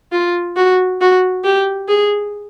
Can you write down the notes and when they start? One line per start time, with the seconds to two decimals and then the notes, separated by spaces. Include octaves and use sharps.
0.12 F4
0.57 F#4
1.01 F#4
1.44 G4
1.88 G#4